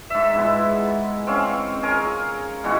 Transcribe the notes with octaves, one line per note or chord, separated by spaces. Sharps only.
G#2 E5
G#3 B3 E4
C4 C#4 F5
G#4 A#4 C#5
B2 E3 G#3 F#4